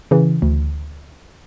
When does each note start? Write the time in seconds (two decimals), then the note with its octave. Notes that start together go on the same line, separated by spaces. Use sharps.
0.11 C#3 E3
0.42 D2